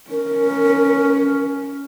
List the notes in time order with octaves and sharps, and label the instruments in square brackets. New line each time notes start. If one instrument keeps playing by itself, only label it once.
[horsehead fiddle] C#4 [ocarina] A#4